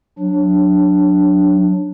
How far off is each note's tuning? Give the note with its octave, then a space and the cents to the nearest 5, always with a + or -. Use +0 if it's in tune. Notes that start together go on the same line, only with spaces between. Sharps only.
F#3 -15 D4 +0